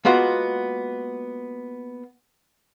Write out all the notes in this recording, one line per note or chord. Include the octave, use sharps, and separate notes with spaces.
G#3 A#3 B3 F4 F#4